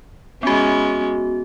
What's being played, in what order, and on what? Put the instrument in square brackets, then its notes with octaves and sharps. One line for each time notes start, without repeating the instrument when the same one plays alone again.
[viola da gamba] G#3 C#4 [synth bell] B3 F#4